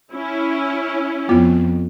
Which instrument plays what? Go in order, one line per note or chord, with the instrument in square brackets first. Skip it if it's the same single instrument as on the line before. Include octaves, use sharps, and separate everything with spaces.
[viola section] C#4 E4
[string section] F2 [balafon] B3 F4